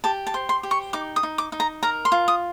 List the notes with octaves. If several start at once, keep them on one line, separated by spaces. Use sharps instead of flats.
G4 A5
A5
C5
C6
G4
C#6
D#4 D6
D#6
D#4
D6
D#4
A#5
A#4 A#5
C6
F4
D#6